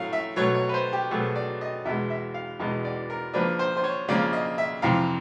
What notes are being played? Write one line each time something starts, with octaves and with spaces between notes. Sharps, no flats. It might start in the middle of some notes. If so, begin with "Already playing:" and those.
Already playing: A2 F#3 A3 F5
E5
B2 F#3 A3 C#5
C#5
B4
C5
G4
B2 F#3 A3 G#4
D5
D#5
E2 B2 G#3 E5
E5
F5
E2 B2 G#3 D#5
D5
A#4
C#3 F3 A#3 D4 B4
C5
C5
C#5
C#3 F3 A#3 D4 D5
D#5
E5
F2 C3 E3 F5